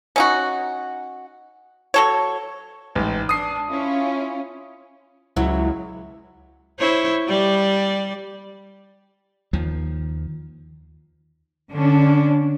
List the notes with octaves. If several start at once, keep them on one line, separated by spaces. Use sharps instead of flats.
C#4 D#4 F#4
F#3 A4 C#5
A1 G#2
D4 D#6 C7
C#4 E4 F4
C#2 F#3 E4 C#5
E4 C5 C#5
G3 D5
D#2 D#3 F3
D3 C#4 D4